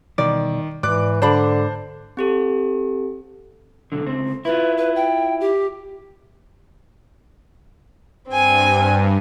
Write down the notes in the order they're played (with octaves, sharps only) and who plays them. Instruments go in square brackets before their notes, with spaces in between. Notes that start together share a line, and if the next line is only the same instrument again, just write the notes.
[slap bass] B2 E3 G3 [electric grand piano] D#3 [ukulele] D5
[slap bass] G#2 [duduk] E3 [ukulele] D5 [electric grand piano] D6 F#6
[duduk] D3 [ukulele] D4 D5 B5 [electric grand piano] C5 A5
[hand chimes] C4 G4 A4
[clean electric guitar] B1 D3
C#2 C4
[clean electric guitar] E4 F4 [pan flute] B4
[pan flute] B4
G5
G4
[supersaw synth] G2 [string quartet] C4 G#5